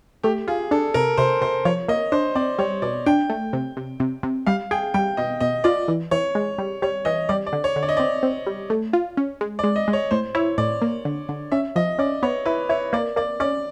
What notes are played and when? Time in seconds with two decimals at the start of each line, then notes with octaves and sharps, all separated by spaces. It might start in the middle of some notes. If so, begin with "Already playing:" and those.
0.24 A3 G4
0.47 F4 G#4
0.71 D4 A4
0.94 C3 A#4
1.17 C3 C5
1.42 C3 C5
1.65 F3 C#5
1.88 A#3 D#5
2.12 D4 C5
2.35 C4 D5
2.58 G3 C#5
2.82 B2 D5
3.06 D4 G5
3.30 A3
3.53 C3
3.77 C3
4.00 C3
4.23 C3
4.46 G3 F5
4.71 G#4 G5
4.94 G3 G5
5.17 B2 D#5
5.40 B2 D#5
5.64 F4 D5
5.88 E3
6.11 E3 C#5
6.35 G#3
6.58 G3
6.82 G3 C#5
7.05 E3 D#5
7.29 G3 D5
7.46 D5
7.53 D3
7.64 C#5
7.76 D3
7.83 D5
7.89 D#5
7.97 C4 D5
8.23 C4
8.47 G3
8.70 A3
8.93 F4
9.17 C#4
9.41 G#3
9.59 D5
9.64 G#3
9.76 D#5
9.88 G#3
9.93 C#5
10.11 A2 C5
10.35 E4 C#5
10.58 A2 D5
10.82 A#3
11.05 D3
11.29 D3
11.52 C#4 E5
11.76 F3 D#5
11.99 C#4 D5
12.23 B3 C#5
12.46 E4 B4
12.69 E4 C#5
12.93 A#3 D5
13.16 A#3 D5
13.40 C#4 D5